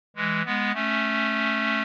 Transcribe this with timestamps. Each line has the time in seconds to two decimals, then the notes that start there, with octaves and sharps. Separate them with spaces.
0.16 E3 G#3
0.45 G#3 B3
0.74 A3 C#4